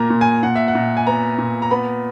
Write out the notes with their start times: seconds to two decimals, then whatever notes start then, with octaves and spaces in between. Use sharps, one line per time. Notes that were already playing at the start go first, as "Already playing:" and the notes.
Already playing: A#2 A#3 A#5
0.10 A#2
0.21 G#5
0.43 A#2 F#5
0.56 E5
0.68 F#5
0.75 A#2
0.97 G#5
1.07 B3 A#5
1.38 A#2
1.62 A#5
1.71 B3 B5